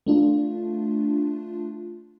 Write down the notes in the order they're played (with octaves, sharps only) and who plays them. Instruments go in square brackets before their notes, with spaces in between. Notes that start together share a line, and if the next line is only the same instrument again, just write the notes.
[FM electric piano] A3 D4 F4